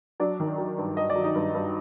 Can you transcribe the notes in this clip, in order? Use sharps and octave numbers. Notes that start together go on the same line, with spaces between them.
F#3 D4 D5
D#3
F#3
G2
G2 D#5
D5
F#3
D#4 D#5
G2
G2